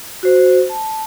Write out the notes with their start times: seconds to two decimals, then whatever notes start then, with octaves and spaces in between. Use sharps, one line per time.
0.23 F#4 C5
0.69 A5